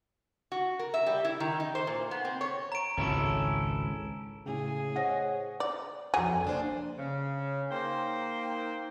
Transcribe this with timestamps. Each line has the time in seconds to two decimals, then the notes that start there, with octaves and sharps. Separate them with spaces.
0.52 F#4
0.79 A#4
0.94 E5
1.06 G3
1.25 E4
1.40 D#3
1.60 D#4
1.75 C5
1.87 A#2
2.11 B3
2.25 C4
2.41 C#5
2.72 A#5 D7
2.97 G#1 C#2 C#4 E4 A4
4.46 A2 C#3 G#4
4.96 C5 C#5 D#5 F#5 A#6
5.60 D5
6.14 F2 F#3 G#4 A4 G#5
6.45 A#3 D4 C5
6.98 C#3
7.70 A#3 D#4 C5 G5